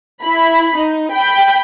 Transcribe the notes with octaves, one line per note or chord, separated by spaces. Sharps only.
E4 B5
D#4
G5 B5